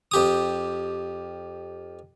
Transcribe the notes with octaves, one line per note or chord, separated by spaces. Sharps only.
F2 G4 D#6